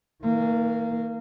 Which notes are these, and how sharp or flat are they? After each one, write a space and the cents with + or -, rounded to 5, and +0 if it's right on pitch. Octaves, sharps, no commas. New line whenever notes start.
D#3 +45 A#3 -20